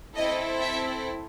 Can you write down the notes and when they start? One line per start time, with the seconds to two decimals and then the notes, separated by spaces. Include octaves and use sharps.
0.15 C4 E4 A4 D#5
0.60 E5